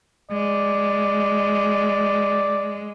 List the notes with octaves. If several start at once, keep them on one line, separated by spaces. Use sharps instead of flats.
G#3 D5